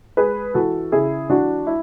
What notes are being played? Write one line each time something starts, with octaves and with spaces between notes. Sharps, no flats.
G#3 G#4 B4
E3 F#4 A4
C#3 E4 G#4
E3 D4 F#4
E4